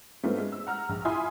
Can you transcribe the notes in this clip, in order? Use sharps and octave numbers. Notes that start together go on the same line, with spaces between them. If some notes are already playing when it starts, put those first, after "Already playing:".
G#2 A3 B3 C4 D4 F4
G#3
E6
F#5 A#5 F6
A#1
E4 F4 G#5 B5 C6 D#6